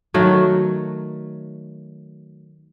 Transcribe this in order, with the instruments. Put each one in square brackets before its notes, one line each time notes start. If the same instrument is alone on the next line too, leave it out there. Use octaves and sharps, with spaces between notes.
[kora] D#3 F#3 A3